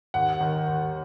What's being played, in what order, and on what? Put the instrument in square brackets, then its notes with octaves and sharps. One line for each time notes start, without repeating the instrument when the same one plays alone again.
[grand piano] D#2 F#5
D#3
D#2